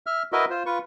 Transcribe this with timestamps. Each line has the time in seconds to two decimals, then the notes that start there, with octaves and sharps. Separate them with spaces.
0.07 E5 F6
0.32 E4 F#4 A#4 B4 D#5 E5
0.50 F4 C5
0.66 F4 B4 C#6